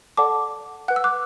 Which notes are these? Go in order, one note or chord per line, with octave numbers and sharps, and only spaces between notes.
A4 D5 F#5 A5 D6
B4 F#5 F#6
E6
D6 F#6